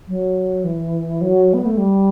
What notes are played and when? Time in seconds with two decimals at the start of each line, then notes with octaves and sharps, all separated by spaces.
0.08 F#3
0.64 E3
1.21 F#3
1.54 B3
1.66 A3
1.77 G3